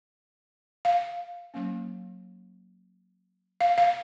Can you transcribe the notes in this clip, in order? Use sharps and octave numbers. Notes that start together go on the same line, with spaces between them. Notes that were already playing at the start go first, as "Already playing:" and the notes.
F5
F#3 A#3 C#4
F5
F5